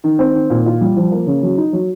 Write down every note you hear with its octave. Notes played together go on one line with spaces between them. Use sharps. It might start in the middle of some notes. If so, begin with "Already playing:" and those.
D#3
C4
D#3
A#2
F4
G3
F3
A#3
C#3
F#3
D#4
F#3